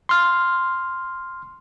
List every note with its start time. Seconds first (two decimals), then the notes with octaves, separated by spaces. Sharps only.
0.09 C6 F6